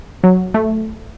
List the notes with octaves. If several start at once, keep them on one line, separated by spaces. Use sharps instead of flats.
F#3
A3